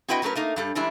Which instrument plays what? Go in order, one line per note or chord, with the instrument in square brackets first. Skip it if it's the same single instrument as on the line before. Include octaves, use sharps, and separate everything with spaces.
[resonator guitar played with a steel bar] C4 E4 F#4 B4 D#5 G5
F#3 A3 C#4 A#4 B4
A3 A#3 D#4
G2 G3 A4
E3 G3 G#3 D4 E4